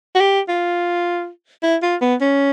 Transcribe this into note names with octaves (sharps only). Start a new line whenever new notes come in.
F#4
G4
F4
E4
F4
B3
C#4